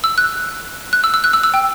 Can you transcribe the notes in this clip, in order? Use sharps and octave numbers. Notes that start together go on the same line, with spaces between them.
E6
F#6
F#6
E6
E6
F#6
E6
E6
G5